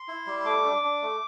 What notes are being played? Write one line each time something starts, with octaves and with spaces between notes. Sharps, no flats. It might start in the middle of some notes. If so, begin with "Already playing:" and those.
Already playing: C6
E4
G3
C6
A3 D6
D4
D4
A3